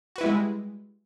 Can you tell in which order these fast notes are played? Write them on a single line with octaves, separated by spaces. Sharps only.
F#4 B4 E4 G3 G#3